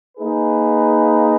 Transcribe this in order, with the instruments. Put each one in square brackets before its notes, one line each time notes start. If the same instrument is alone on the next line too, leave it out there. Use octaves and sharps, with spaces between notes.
[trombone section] A#3 D#4 G#4 B4